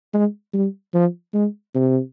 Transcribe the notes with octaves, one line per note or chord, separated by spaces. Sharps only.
G#3
G3
F3
G#3
C3